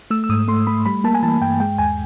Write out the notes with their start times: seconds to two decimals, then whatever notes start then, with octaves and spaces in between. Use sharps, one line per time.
0.11 A3 E6
0.24 E6
0.29 G#2 D#6
0.48 A3 C6
0.67 A3 B5
0.86 G3 B5
1.04 A#3 A5
1.14 G#5
1.23 E3 A5
1.41 G2 G5
1.60 G#3 G5
1.78 D#2 G#5